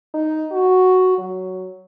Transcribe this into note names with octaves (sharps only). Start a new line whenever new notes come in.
D#4
F#4
F#3